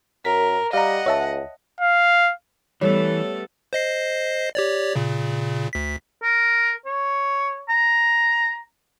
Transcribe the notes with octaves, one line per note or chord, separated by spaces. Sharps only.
F#2 A#4 B6
G3 D#5 F5 F#5 A#5
C#2 C#5 E5 A5
F5
E3 G3 A3 B3 A4 C#5
C5 D#5 C7
G4 C#5 D5
A#2 C#3
D2 B6
A#4
C#5
A#5